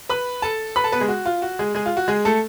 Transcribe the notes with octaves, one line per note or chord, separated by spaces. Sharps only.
B4 B5
A4 A5
B4 B5
A4 A5
B3 B4
G#3 G#4
F#4
F4
F#4
G#3 G#4
G#3 G#4
F4
F#4
G#3 G#4
A3 A4